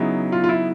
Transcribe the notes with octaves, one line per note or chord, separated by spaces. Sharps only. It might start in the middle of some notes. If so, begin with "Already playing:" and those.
Already playing: C#3 F#3 B3 D#4 E4
F4
F4
E4